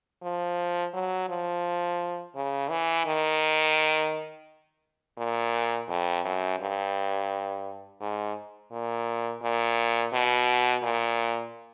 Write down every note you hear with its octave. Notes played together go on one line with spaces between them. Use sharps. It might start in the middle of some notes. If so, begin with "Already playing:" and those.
F3
F#3
F3
C#3
E3
D#3
A#2
F2
F#2
G2
G#2
A#2
A#2
B2
A#2